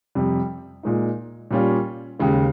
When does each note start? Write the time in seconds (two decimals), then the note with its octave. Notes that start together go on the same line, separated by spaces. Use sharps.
0.15 F2 C3 G3
0.83 A#2 G#3 D#4
1.51 A#2 G3 C#4 F4
2.19 D#2 C#3 G#3